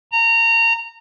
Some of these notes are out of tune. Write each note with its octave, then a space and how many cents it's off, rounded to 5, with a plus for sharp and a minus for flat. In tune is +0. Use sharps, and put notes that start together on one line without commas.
A#5 -25